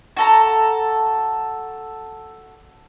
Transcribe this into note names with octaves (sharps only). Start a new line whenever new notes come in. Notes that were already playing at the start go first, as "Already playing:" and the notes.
F#4 A4 A#5